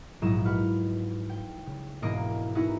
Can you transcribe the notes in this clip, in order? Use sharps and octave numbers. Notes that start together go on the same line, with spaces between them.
A#1 G#2 F#3 E4 D#5 E7
F#4 B4 F6
G5
C#3
E1 G#2 A#3 D#5 D6 D7
B3 D#4 E4 F#4 G#4 B4